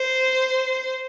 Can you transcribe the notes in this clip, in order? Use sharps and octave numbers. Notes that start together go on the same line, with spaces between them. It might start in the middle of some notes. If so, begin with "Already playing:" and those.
Already playing: C5